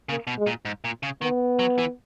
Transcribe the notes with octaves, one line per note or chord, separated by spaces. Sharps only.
C#3 A#3
B2
G#3
A#2
G#2
A#2
C#3
D#3 B3
F#3
E3